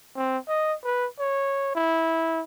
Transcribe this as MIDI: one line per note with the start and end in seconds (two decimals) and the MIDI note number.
0.16 0.38 60
0.48 0.75 75
0.84 1.07 71
1.19 1.74 73
1.75 2.42 64